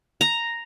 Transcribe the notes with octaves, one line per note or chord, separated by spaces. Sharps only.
A#5